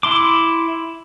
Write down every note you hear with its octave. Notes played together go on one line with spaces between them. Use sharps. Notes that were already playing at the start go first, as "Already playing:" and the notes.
E4 C6 D6